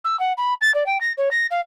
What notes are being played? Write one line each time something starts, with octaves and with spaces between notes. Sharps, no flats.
E6
F#5
B5
A6
D5
G5
A#6
C#5
A#6
F5